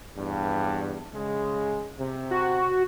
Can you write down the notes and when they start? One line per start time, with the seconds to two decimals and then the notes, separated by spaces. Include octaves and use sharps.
0.17 E2 G2
1.14 C#3 G#3
1.99 C3
2.31 F#4